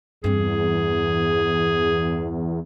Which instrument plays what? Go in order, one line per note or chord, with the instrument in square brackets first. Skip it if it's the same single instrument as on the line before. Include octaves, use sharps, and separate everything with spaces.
[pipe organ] E2 [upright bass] G2 C4 [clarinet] G#4